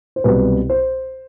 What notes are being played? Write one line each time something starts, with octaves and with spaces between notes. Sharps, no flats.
C5
C2 B2 F#3 B4
C5